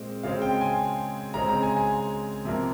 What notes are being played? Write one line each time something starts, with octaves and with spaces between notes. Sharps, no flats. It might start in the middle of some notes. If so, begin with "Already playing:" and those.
Already playing: A#2 G#3 C4
C#3 G#3 C4 F5
G5
G#5
C#3 G#3 C4 A#5
A#5
G#5
G#5
C3 F3 A#3